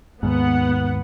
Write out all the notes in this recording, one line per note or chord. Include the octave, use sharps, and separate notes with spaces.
D#2 G#2 B3 F#5